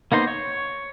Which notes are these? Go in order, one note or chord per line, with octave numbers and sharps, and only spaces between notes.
A#3 B3 D#4 C5
C#5